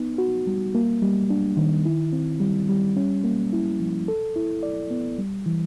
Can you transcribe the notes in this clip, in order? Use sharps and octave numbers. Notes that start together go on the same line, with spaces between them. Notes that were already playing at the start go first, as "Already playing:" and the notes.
Already playing: B3 D#4
F#4
G3
A#3
G3
D4
D#3
E4
C4
G3
G3
C#4
A#3
E4
F3
A4
E4
D5
B3
G3
E3